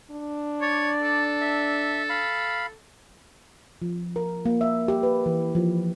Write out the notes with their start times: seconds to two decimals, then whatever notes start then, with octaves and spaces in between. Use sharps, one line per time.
0.11 D4
0.62 C#5 D5
1.02 A4
1.41 E5
2.10 F5 B5
3.82 F3
4.16 A#4
4.46 A#3
4.61 E5
4.88 G4
5.03 B4
5.26 E3
5.55 F3